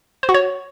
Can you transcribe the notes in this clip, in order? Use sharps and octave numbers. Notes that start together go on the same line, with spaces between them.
C5
F#4
C#5